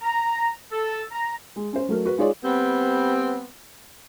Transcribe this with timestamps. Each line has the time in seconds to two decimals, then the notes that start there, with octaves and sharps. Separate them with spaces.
0.02 A#5
0.72 A4
1.12 A#5
1.56 G#3
1.73 C#4 C5
1.89 F#3 A3 A#4
2.05 F#4 B4
2.18 G#3 D#4 F4 G#4 C#5 D5
2.43 G3 B3 C4